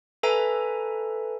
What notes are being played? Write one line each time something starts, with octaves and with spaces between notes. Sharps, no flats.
A4 B4 E5 G#5 A#5